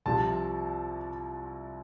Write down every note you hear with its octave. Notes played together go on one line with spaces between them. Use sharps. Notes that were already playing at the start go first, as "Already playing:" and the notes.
C2 C3 F3 A5